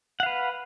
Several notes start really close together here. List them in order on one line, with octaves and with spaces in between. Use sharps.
F#5 F5 B4